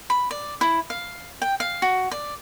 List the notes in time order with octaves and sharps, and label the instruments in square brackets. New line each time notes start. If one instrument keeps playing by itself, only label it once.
[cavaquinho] B5
D5
E4
F5
G5
F5
F#4
D5